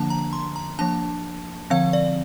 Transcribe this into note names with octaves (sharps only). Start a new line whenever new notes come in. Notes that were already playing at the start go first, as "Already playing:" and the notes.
Already playing: D3 F3 A#3 D4 A5
A#5
C6
A#5
F3 A#3 D4 A5
D3 F3 C4 F5
D5